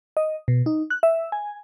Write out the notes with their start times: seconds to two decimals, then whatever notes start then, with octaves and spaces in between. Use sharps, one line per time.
0.17 D#5
0.48 B2
0.66 D#4
0.90 F#6
1.03 E5
1.32 G#5